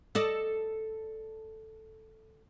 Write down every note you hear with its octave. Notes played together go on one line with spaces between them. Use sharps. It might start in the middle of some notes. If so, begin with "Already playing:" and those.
A4 D5 D#5